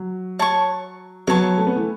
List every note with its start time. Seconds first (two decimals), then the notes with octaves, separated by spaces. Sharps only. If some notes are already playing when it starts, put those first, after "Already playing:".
Already playing: F#3
0.39 C#5 A5 C#6
1.27 F#3 B3 C#5 A5 C#6
1.58 A3
1.67 B3
1.76 E3 A3